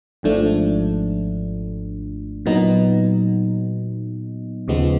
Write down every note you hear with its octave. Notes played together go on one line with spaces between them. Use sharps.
G#1 G#2 F3 A3 D4
A#2 F#3 B3 D#4
D#2 C#3 F3 G#3 B3